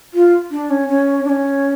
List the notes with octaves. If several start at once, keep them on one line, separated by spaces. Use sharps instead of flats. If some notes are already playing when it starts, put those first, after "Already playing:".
F4
D4
C#4
C#4
D4
C#4